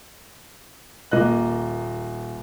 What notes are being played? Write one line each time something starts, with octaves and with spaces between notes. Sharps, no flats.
D#1 A#3 D#5 F#6